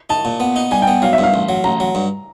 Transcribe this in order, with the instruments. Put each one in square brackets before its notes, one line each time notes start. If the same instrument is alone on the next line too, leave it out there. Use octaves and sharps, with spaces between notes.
[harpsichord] D#4 [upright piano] A5
[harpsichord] A#2
B3
D#4
[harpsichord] G3 [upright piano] G#5
[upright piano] G5
[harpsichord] B3
[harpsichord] F#3 [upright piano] F5
[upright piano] E5
[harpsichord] G2
[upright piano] F5
[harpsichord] A1
F#3
[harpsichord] A1 [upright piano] A#5
[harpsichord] F#3
G2